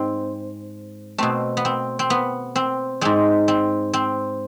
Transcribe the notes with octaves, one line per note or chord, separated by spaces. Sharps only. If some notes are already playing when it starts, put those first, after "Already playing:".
Already playing: G#2 G#3 C4
B2 A3 C4
B3
C4
C4
B3
C4
G#2 G#3 C4
C4
C4